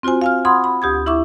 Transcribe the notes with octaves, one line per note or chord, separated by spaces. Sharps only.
C4 F4 F#4 C5 G#5
F5 G#5 F6
F#5 B5 C6 D#6 G#6
B5
D2 G4 D#6 G#6
E4 E5 C#6 D6